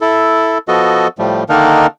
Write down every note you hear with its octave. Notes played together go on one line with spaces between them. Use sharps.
E4 A4
F3 B3 F#4 A4 D#5
A2 F3 G3 A3
D3 D#3 A#3 D4 D#4 A#4